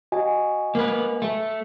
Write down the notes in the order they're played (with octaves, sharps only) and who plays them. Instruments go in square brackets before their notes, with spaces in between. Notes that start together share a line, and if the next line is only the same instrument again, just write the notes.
[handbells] F#4 D#5 G#5
[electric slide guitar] A#3 B4
A3